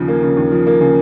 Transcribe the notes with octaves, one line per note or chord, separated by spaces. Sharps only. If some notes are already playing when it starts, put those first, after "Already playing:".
Already playing: D#2 C#3 F3
A#3
C#3
D#2
F3
A#3
C#3